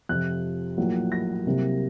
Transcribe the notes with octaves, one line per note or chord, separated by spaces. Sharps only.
F2 C3 F3 F#6
A#1 A2 F#3 A#3
A#6
C2 C3 F#3 A#3